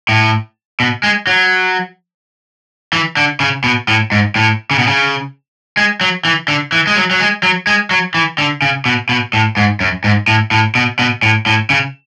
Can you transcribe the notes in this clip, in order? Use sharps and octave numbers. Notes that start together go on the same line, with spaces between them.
A2
B2
G#3
F#3
E3
D3
C#3
B2
A2
G#2
A2
C#3
B2
C#3
G#3
F#3
E3
D3
E3
G#3
F#3
F#3
G#3
F#3
G#3
F#3
E3
D3
C#3
B2
B2
A2
G#2
F#2
G#2
A2
A2
B2
B2
A2
A2
C#3